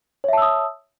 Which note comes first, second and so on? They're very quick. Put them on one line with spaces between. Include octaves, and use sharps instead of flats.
C#5 E5 A5 E6 D#6